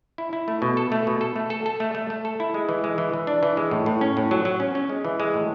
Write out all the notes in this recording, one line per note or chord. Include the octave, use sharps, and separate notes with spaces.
E4
E4
A3
B2
A4
A3
B2
A4
A3
A4
A4
A3
A3
A3
A4
E4
G#3
E3
G#3
E3
E3
D4
E3
G#3
A2
A2
C#4
A2
F#3
F#3
C#4
C#4
G#3
E3
G#3
A2